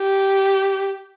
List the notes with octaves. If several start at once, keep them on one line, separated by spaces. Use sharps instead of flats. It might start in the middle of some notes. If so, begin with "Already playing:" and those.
Already playing: G4